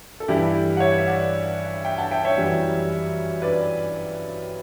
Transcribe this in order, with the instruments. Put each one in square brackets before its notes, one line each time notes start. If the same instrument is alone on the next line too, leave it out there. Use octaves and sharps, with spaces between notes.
[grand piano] A4
G2 E3 G3 E4 G4
F#5
C#5 E5
E5
D5 F#5
E5 G5
F#5 A5
E5 G5
C#5 E5
F#2 E3 G3
B4 D5